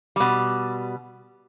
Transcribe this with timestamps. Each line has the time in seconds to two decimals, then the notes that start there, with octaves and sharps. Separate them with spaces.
0.16 B2 G3